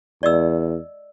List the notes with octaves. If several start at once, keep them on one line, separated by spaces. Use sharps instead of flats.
E2 D5 D#5 E6